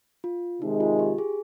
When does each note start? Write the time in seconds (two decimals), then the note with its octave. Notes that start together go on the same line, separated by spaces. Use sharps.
0.24 F4
0.61 C3 D#3 G#3 D#4
0.80 F4
0.99 G4
1.18 G#4